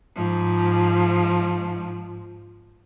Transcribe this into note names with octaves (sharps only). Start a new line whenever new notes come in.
G#2 F3